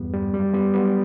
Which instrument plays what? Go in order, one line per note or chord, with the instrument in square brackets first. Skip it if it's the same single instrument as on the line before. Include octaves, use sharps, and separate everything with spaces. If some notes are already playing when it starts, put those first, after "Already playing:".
Already playing: [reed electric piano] E2 G2 G3 B3
G3
F#2 G3
G3 B3
F#3 G3 B3